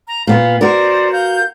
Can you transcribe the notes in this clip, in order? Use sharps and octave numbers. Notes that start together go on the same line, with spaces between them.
A#5
A#2 B3 F5
F#4 A#4 C5 D5
F5 G6